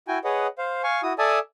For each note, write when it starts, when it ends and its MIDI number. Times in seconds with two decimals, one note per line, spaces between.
0.08 0.18 64
0.08 0.18 66
0.08 0.18 79
0.08 0.18 80
0.24 0.47 68
0.24 0.47 71
0.24 0.47 73
0.24 0.47 75
0.24 0.47 78
0.58 0.82 72
0.58 0.82 77
0.84 1.01 77
0.84 1.01 80
0.84 1.01 85
1.03 1.13 64
1.03 1.13 66
1.03 1.13 87
1.18 1.39 69
1.18 1.39 74
1.18 1.39 76
1.18 1.39 80
1.18 1.39 81
1.18 1.39 87